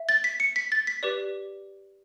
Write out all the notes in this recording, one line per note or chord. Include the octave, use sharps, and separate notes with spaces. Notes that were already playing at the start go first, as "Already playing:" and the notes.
Already playing: E5
A6
B6
C#7
B6
A6
B6
G4 B4 D5